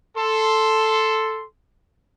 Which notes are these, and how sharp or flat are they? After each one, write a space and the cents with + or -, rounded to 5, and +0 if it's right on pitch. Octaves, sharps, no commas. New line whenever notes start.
A4 +0 C6 +0